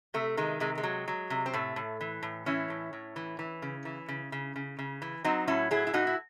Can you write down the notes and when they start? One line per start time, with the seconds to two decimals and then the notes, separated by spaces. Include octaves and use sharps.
0.14 C3 A3
0.37 D#3 G#3
0.60 C3 G#3
0.78 G#3
0.83 F#3
1.08 F#3
1.30 C3
1.46 C4
1.53 A2 A3
1.76 A2
2.01 E3
2.23 A2
2.46 E3 C#4 E4
2.70 A2
2.93 A2
3.16 E3
3.39 E3
3.62 C#3
3.85 E3
4.08 C#3
4.32 C#3
4.56 C#3
4.79 C#3
5.02 E3
5.24 F#3 C4 D#4
5.47 A2 C#4 E4
5.71 F#3 E4 G#4
5.87 E4
5.93 A2 D#4 F#4
6.07 E4